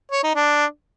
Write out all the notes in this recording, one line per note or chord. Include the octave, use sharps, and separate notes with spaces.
C#5
D#4
D4